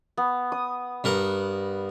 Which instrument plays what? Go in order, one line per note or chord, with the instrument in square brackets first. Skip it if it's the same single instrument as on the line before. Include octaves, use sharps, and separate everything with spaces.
[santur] B3
D#6
[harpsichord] G2 A#4 F#5